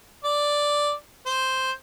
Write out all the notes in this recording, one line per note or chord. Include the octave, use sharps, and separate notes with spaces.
D5
C5